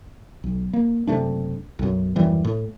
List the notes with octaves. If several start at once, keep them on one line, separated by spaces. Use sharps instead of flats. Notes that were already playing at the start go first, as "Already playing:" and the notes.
B1
A#3
F#1 C3 A3 D4
B1 F#2
D#1 F#2 E3 G3
A2